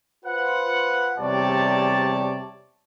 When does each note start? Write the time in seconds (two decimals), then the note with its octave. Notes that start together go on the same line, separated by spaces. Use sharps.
0.25 F4 B4 C5 F#5
1.18 E2 C3 G3 C#5 D5 A5